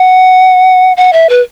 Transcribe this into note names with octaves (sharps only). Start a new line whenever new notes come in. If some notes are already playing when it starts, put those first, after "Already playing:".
Already playing: F#5
F#5
E5
B4